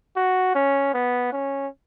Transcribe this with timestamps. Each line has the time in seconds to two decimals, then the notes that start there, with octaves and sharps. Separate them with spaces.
0.16 F#4
0.55 C#4
0.94 B3
1.32 C#4